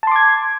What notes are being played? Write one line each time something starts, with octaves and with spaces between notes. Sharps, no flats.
A5 C6 D6 G#6